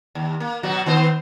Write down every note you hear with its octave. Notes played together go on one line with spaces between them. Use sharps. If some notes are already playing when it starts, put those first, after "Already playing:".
D#2
A#3
B2 F#3 F#4
D#3 B3 C5